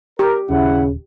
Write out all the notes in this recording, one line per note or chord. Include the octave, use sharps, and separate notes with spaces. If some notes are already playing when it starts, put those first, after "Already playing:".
G4 A#4
D#1 D#2 C#3 E4 F#5